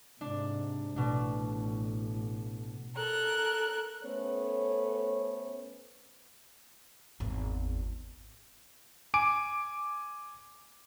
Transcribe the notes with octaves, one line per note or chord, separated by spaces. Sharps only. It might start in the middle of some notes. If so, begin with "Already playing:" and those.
G#2 C3 D4
A1 B2 D4
A4 A#4 F#6
A3 B3 C#4 A4 C5 C#5
G#1 E2
G#5 D6 D7